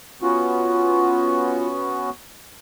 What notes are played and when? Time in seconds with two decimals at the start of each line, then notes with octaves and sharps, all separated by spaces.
0.22 B3 C#4 F4 F#4